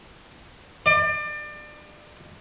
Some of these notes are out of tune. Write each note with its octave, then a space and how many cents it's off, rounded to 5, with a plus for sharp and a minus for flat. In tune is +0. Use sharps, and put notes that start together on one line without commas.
D5 +30